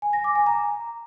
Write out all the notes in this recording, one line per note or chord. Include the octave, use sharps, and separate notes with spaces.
G#5
A#6
D6
G#5
A#5